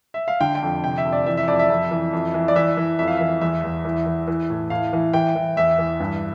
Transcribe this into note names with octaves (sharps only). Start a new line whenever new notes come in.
E5
F5
D3 G5
G5
F2
C3 G5
E5
F2
D5
E3 E5
E5
F2 D5
E5
F2
E3
F2
E3
D5
E3 E5
E3
F2 E5
F5
E3 E5
E2 E5
E2
E3
E3
E3
A2
A2 F5
E3
E3 G5
E3
E2 E5
E3
G2